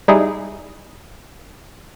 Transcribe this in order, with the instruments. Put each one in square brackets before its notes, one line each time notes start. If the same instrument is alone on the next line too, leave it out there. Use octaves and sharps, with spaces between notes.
[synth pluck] G3 D#4 E4 G#4